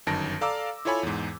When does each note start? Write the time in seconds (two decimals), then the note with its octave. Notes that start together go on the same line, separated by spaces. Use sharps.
0.07 G1 F#2 D#3 A5 A#6 D7
0.41 A4 D5 F5 A#5 D6 E6
0.85 E4 F4 A4 C#5 G#5 B5
1.03 E2 G#2